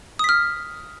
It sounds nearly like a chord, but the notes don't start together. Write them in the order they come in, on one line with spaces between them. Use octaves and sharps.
D#6 B6 F6